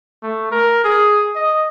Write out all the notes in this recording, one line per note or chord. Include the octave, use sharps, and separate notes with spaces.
A3
A#4
G#4
D#5